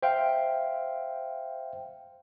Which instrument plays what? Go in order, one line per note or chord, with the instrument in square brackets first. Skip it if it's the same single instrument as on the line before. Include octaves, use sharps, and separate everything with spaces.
[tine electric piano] C5 E5 F5 G5